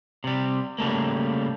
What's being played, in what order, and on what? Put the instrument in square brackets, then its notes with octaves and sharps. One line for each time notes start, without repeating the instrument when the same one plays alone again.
[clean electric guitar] C3 G3
C#3 G3 A3 A#3